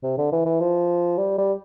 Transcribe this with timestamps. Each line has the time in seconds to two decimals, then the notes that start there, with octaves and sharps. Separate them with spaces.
0.03 C3
0.18 D3
0.32 E3
0.46 E3
0.60 F3
1.18 G3
1.38 G3